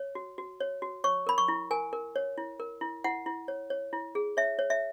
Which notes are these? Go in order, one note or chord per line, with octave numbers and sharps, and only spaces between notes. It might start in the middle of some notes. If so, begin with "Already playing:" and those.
Already playing: C#5
F#4
F#4
C#5
F#4
C#5 C#6
A#4 B5
C#6
E4
A#4 G#5
A#4
C#5
E4
A#4
E4
E4 F#5
E4
C#5
C#5
E4
G#4
C#5 E5
C#5
E5